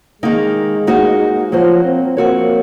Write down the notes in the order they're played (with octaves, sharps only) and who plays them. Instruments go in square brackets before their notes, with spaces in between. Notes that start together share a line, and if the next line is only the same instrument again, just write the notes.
[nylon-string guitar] D#3 A#3 D#4 [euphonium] G#3
[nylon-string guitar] A#3 D#4 F#4 C5
[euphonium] F3 [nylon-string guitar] F#3 A#3 F4 C5
[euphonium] C4
[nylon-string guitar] F3 C4 F#4 C#5 [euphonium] A#3